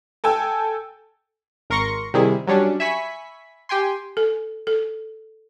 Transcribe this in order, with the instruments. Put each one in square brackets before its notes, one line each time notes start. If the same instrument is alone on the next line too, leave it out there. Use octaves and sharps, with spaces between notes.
[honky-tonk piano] A4 G5 G#5 E6
[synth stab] G#1 A#4 C6 C#6 A#6 C#7
C3 D#3 G3 E4 G#4
F#3 G3 C#4 D4
E5 G#5 B5 C#6 B6
G4 G5 G#5 C6
[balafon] A4
A4